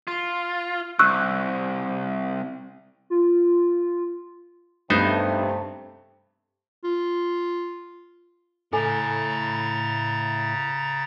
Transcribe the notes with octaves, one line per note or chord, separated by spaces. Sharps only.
F4
C2 C#6 E6 F#6
F4
G2 C3 A3 B3 D#4 C5
F4
A2 C#3 A4 G#5 A#5 A6